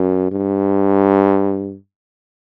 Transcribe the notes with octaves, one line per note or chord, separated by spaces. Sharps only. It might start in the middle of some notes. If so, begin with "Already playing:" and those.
Already playing: F#2
G2